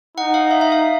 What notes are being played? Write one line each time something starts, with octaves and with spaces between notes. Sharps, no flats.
D#4 F#5
F5
E5
E5
F5